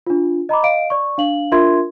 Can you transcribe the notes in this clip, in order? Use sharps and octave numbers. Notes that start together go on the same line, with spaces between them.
D4 F4
D#5 A#5 B5 D6
D#5 F5 D7
D5 C#6
D4 F5 F#7
D4 F4 A#4 E5 C6 G#6